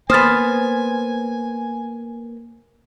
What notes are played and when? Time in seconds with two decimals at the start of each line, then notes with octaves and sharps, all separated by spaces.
0.10 A#3 B3 C5 G#5 D#6 F6 A6